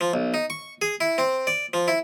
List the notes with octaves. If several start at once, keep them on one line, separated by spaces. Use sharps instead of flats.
F3
B1
D#4
C#6
G#4
E4
C4
D5
F3
E4